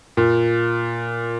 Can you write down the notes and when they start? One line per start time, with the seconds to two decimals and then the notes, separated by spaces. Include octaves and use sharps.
0.17 A#2